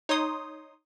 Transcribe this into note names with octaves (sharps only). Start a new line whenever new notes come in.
D#4 C#5 C6 D#6